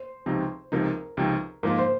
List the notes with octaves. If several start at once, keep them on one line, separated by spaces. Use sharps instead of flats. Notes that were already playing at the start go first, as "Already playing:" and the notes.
Already playing: C5
C#2 C3 F3 C4 D#4
C#2 C3 F3 C4 D#4 A#4
C#2 C3 F3 C4 D#4
G#2 F3 A#3 F4 A#4
C5